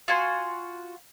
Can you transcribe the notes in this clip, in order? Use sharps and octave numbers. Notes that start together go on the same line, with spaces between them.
F4 F#4 G#5 C6